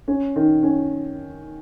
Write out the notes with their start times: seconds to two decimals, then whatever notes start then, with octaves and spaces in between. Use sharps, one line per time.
0.08 C#4
0.36 D#3
0.63 C#4